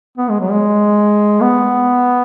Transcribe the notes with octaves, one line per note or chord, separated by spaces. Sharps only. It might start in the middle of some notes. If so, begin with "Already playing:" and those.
B3
G#3
F#3
G#3
B3